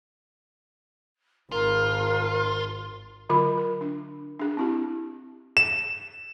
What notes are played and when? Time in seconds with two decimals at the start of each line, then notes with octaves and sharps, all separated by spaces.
1.52 G#1 F4 A#4
3.29 D3 F#3 F4 A#4 B5
3.58 A#4
3.81 D4
4.39 D4 G#4
4.57 C4 E4 G4
5.57 E7